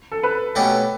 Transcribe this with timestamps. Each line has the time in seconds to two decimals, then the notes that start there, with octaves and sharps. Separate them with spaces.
0.12 A4
0.23 B4
0.55 B2 A3 C#4 G4